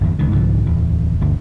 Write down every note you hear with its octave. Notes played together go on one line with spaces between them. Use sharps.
G1 E2
C#2 D#3
C2 G#2 D3 F3
D1 E2
G1 D2